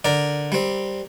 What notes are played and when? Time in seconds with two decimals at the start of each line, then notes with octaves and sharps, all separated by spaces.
0.05 D3 A#4 D5
0.52 G3 C4